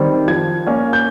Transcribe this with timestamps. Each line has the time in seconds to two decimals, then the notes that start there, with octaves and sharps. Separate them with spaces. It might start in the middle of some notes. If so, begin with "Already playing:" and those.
Already playing: D#3 G3 C4
0.28 F3 G#6
0.67 A#3 C#4
0.93 G6